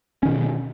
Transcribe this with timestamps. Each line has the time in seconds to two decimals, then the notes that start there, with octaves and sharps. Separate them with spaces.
0.23 C#4
0.25 D#3
0.28 B2